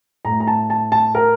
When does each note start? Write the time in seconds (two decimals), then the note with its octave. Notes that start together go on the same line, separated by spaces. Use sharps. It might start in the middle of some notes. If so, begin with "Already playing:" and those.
0.25 A2 A#5
0.40 A#5
0.47 A5
0.70 A5
0.92 A5
1.15 A#4